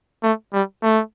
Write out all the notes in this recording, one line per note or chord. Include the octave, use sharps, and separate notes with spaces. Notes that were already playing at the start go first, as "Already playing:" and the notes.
A3
G3
A3